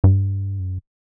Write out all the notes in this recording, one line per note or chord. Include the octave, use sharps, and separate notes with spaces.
G2
F#2